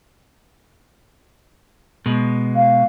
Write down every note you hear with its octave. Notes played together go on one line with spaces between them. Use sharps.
B2 G#3
F5